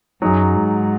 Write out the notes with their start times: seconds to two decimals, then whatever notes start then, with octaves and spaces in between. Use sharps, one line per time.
0.22 F#2 F#3 D#4 G#4
0.55 G#2